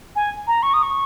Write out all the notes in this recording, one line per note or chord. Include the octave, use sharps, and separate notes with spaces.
G#5
A#5
C#6
D#6
C#6